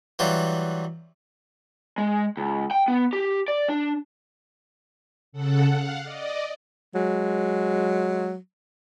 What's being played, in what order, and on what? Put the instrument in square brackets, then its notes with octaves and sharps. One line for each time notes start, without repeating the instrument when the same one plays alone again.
[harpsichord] E3 F#3 G3 F4
[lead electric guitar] G#3
C#2
G5
B3
G4
D5
D4
[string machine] C#3 A4 F#5
F5 F#5
D5 D#5
[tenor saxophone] F#3 [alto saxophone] G#3